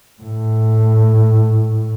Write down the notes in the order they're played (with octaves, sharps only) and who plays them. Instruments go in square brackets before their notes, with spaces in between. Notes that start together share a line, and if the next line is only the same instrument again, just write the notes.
[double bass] A2